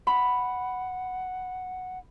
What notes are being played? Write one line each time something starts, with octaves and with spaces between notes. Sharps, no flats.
F#5 B5